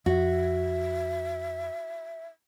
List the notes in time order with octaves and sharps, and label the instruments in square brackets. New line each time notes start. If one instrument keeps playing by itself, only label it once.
[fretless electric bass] F2 [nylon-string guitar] F#4 [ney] E5